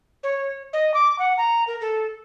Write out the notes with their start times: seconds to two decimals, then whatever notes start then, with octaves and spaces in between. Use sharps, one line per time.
0.23 C#5
0.73 D#5
0.94 D6
1.19 F#5
1.37 A#5
1.67 A#4
1.81 A4